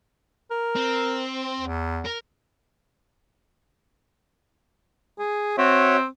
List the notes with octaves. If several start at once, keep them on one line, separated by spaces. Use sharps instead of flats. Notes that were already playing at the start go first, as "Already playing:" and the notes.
A#4
C4
E2
A#4
G#4
C4 F#4 C#5 E5